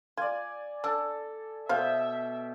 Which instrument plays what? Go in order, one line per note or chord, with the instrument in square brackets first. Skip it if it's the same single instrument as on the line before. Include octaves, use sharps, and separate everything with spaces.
[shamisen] F4 [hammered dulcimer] D5 G#5
[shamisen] D4 [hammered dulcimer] A4
[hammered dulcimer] B2 G5 [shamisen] C5 F5 [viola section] E5